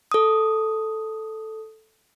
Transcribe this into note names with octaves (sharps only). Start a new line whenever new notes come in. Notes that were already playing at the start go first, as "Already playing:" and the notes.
A4 D#6